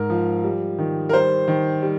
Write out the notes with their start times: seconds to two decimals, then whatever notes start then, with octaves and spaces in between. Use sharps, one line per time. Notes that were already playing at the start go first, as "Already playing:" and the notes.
Already playing: G#2 A#4
0.10 F3
0.44 G3
0.79 D#3
1.09 A#4
1.13 G3 C5
1.48 D#3
1.82 G3